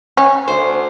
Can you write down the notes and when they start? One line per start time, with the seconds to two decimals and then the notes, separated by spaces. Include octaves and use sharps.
0.17 C#4 G#5
0.48 D2 C5